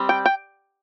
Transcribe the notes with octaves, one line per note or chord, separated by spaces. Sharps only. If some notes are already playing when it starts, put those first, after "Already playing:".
Already playing: G3 C4
G5
G5